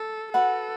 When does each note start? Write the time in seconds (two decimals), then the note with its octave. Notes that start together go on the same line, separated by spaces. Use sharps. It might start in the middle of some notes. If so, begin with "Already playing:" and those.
Already playing: A4
0.34 F#4 A4 B4 F#5